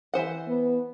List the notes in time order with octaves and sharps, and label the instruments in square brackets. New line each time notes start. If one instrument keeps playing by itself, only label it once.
[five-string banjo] E3 C5 F#5
[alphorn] B3